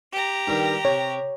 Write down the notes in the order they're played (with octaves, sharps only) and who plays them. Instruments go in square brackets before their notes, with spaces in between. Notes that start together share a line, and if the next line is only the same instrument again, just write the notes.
[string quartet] G4 A#5
[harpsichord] G2 D#3
[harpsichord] C3 [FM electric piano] C#5